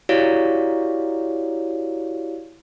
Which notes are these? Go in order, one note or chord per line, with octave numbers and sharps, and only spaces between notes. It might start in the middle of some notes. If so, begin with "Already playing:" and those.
E4 F#4 G4 C#5 D5 F5